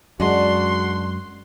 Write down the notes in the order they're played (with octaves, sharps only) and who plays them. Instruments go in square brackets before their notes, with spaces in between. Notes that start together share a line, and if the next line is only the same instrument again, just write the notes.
[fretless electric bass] F#2 G#3 [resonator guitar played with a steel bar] D4 D#5 [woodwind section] F#4 F#5 [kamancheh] C6